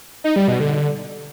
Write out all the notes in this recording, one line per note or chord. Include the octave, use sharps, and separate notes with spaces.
D#4
G3
B2
D3